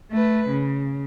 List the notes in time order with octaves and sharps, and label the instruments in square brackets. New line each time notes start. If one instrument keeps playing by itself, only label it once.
[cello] A3 B4
C#3